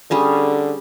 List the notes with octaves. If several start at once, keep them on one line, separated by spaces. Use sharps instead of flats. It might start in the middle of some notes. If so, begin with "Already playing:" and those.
D3 G3 C#4 G#4